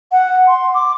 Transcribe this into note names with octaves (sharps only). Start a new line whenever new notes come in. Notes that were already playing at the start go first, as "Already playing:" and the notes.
F#5
C6
D6